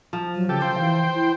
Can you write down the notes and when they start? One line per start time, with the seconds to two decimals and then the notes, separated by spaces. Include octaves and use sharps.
0.13 F3
0.35 F#3
0.49 C#3 G4 A4
0.62 C5 F5 G5
0.78 E3
1.14 E4